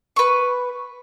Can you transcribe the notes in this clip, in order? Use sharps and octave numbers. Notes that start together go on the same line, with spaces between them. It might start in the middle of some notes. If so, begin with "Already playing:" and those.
B4 C#6